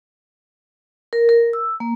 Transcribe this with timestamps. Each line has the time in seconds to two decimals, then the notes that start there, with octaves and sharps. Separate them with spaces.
1.13 A#4
1.29 A#4
1.53 E6
1.80 A#3